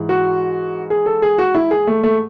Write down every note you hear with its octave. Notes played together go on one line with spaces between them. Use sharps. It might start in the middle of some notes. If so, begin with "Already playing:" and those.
Already playing: G#2 E3
F#4
G#4
A4
G#4
F#4
E4
G#4
A3
A3